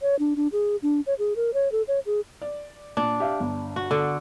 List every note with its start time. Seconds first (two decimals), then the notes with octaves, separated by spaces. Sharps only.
0.02 C#5
0.19 D4
0.36 D4
0.52 G#4
0.82 D4
1.07 C#5
1.19 G#4
1.36 A#4
1.54 C#5
1.72 A4
1.88 C#5
2.06 G#4
2.42 D5
2.97 A#2 D4
3.20 G4 E5 F5
3.40 G1
3.76 F#4
3.91 D3